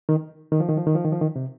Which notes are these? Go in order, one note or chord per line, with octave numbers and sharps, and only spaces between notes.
D#3
D#3
F3
D#3
F3
D#3
F3
D#3
F3
D#3
C3